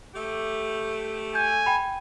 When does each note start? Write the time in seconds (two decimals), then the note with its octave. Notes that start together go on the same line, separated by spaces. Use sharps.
0.15 A3 G4
1.35 G#5 G6
1.66 G5 B5